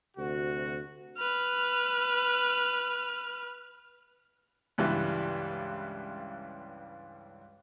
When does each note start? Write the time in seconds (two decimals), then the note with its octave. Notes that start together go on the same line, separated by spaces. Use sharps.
0.17 D2 C3 F#4
1.18 B4 F6
4.78 C#2 G2 E3 G3